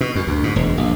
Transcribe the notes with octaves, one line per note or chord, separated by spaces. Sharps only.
B2
F#2
D2
G#2
E1
A#1